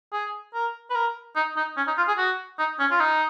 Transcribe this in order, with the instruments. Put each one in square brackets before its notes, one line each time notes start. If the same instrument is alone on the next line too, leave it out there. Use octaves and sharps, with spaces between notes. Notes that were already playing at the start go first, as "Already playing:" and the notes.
[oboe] G#4
A#4
B4
A#4
D#4
D#4
C#4
D#4
F4
G#4
F#4
D#4
C#4
F4
D#4